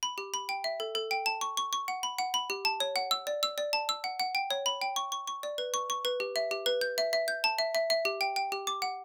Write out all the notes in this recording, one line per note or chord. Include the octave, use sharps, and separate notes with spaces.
B5
G4
B5
G5
E5
A4
A4
G5
A5
C#6
C#6
C#6
F#5
B5
F#5
B5
G4
A5
C#5
F#5
E6
D5
E6
D5
A5
E6
F#5
F#5
G5
C#5
B5
G5
C#6
C#6
C#6
D5
B4
C#6
C#6
B4
G4
E5
G4
B4
G6
E5
E5
G6
A5
E5
E5
E5
G4
G5
G5
G4
D6
F#5